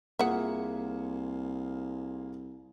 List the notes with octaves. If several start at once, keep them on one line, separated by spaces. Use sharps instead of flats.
C2 A#3 F4 G#4 E5 F#5